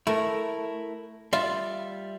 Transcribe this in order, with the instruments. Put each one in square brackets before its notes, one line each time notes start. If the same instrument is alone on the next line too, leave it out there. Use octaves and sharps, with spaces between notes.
[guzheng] A3 [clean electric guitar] E4 A#4
[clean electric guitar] G3 D5 E5 [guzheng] F4